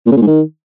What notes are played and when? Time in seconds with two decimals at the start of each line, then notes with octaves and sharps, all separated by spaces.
0.07 A#2
0.12 C#3
0.17 A#2
0.22 G#2
0.27 D#3